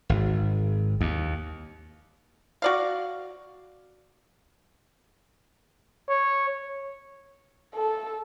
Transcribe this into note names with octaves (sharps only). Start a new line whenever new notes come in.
G#1
D#2
F#4 D5 F5
C#5
A4